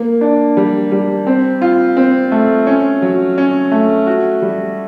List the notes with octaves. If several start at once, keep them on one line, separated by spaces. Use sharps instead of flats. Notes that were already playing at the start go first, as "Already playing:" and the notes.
Already playing: A#3
D4
G3
G3
C4
F4
C4
A3
C#4
F#3
C#4
A3
F#4
G3